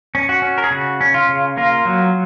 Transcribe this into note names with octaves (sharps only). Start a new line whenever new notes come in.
C#4
F#4
C#4
A#4
G#4
C#3 F#4
C#4
F4
C#3
A#3 F4
F#3